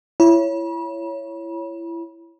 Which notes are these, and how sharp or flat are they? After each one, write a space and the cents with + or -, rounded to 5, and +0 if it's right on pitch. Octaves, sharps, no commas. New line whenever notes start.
E4 +25 C#5 +0 B5 -40